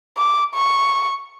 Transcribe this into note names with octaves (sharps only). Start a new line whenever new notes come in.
D6
C#6